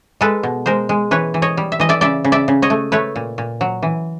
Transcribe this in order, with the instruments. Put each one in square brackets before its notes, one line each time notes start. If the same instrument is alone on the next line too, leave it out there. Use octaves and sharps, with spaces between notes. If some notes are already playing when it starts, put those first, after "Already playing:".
[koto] G#3 A4 B4
B2
G#3 A#4 C5
G#3
E3 B4 C#5
E3
C#5 D#5
G3
E5
E3 D#5
D5 E5
C#3 D5 E5
C#3
D5 E5
C#3
C#5 D#5
A3
A3 B4 C#5
A#2
A#2
F#3
E3